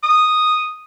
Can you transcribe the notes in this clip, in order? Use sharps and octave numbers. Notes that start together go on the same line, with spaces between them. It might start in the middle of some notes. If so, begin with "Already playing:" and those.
D#6